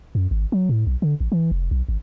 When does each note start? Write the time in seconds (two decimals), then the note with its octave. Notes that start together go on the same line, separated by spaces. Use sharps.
0.15 F#2
0.31 G#1
0.52 F#3
0.69 A2
0.87 B1
1.02 D3
1.20 A1
1.32 E3
1.51 F1
1.71 B1
1.89 G#1